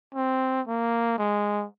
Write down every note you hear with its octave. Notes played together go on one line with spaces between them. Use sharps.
C4
A#3
G#3